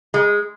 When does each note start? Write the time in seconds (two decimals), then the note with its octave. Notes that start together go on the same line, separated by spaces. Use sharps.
0.14 G#3